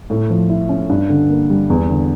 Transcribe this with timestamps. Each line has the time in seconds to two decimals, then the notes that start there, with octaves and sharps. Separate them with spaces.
0.10 A2
0.30 F3
0.50 E4
0.69 C#4
0.90 G2
1.09 D3
1.30 A#3
1.50 G3
1.70 E2
1.89 D3